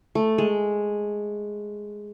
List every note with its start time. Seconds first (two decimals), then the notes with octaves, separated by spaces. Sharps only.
0.15 A3
0.38 G#3